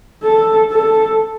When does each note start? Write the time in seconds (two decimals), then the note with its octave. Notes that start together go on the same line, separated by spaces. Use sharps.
0.23 A4
0.71 A4